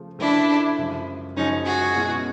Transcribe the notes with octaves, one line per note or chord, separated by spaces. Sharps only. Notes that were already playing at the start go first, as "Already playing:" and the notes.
Already playing: C#3 F3 A3
C#3 F3 A3 D4 E4
F#2 C#3 F3 G#3
F#2 C#3 F3 G#3 C#4 D#4
F#4 G#4
B2 G#3 C#4 E4